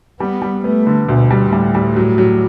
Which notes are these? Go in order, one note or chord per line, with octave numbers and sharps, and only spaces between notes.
G3 B3
G3
A3 B3
D3
D2 B2
G3
A2 G3
G3
F#3
F#3